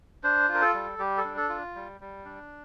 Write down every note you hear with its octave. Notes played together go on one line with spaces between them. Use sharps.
D4 C5
F4
A#4
A4
G3
G3 G4
A4
D4
A4
F4
G3
G3
D4